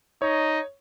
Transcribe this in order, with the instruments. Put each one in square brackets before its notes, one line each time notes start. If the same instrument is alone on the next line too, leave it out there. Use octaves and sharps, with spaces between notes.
[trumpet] D#4 [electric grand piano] C#5